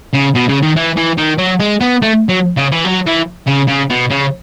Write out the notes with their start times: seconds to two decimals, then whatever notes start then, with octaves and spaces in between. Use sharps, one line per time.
0.13 C#3
0.35 B2
0.49 C#3
0.62 D#3
0.76 E3
0.97 E3
1.18 D#3
1.38 F#3
1.60 G#3
1.81 B3
2.02 A3
2.29 F#3
2.57 C#3
2.72 E3
2.85 F#3
3.07 E3
3.47 C#3
3.68 C#3
3.90 B2
4.10 C#3